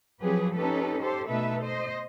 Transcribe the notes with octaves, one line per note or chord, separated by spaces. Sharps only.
F3 F#3 C4 G4 G#4 B4
C#4 D#4 G4 A4 B4
G4 A4 C5
B2 A3 D#4 A4 B4 E5
C5 D#5